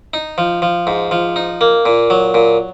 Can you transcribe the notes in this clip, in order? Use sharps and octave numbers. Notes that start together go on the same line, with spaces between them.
D#4
F3
F3
G#2
F3
D#4
A#3
A#2
F#3
A#2